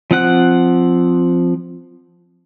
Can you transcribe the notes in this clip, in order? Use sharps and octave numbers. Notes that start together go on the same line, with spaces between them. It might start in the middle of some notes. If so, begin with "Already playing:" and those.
F3 C4 F#5 F#6